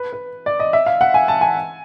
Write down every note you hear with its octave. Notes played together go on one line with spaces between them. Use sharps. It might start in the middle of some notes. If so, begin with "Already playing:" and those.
Already playing: B4
B4
D5
D#5
E5
F5
F#5
G#5
A5
G#5